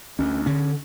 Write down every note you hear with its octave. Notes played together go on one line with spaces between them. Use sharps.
D2 C#4
D3 C#4